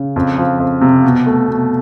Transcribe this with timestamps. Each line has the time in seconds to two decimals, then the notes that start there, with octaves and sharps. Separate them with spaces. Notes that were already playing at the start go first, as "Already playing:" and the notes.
Already playing: C#3
0.16 F2
0.38 F3
0.60 F2
0.81 C3
1.04 B2
1.27 A3
1.48 B2